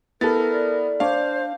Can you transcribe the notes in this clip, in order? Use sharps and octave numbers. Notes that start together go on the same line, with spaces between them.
B3 E4 A4 A#4 A6
D5
D4 C5 C#5 F5